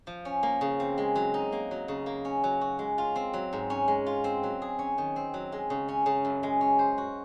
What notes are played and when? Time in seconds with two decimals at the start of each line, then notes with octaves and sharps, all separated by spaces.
0.07 F3
0.25 C#4
0.43 A#3
0.61 C#3
0.80 C4
0.98 G#3
1.16 F#3
1.34 D#4
1.52 A#3
1.71 F#3
1.88 C#3
2.06 A#3
2.25 C#4
2.44 F#3
2.61 F#4
2.79 G#3
2.98 F4
3.16 C4
3.34 F#3
3.53 G#2
3.70 C#4
3.88 G#3
4.06 F4
4.24 C4
4.44 F#3
4.62 G#4
4.79 C#4
4.98 D#3
5.16 C4
5.34 F#3
5.52 G#3
5.70 C#3
5.89 C#4
6.06 C#3
6.25 F#2
6.43 G#3
6.61 C#4
6.79 C5
6.98 F#4